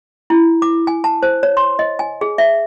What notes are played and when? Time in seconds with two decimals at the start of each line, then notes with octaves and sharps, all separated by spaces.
0.30 E4
0.62 D6
0.87 G#5
1.04 A5
1.23 C5
1.43 C#5
1.57 C6
1.79 D#5
1.99 G#5
2.21 G#4
2.38 E5